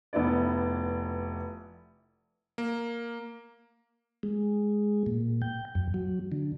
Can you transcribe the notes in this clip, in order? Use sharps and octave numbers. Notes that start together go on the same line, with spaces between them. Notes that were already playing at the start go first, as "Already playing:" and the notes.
F1 B3 E4 D5
A#3
G#3
A#2
G5
F#2
F#3
D3